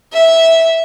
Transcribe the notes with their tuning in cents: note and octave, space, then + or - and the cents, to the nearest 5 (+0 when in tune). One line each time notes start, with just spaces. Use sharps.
E5 -10